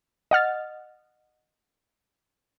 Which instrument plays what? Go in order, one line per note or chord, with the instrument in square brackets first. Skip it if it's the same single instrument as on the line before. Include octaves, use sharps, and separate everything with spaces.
[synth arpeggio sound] D#5 F#5 F6 A6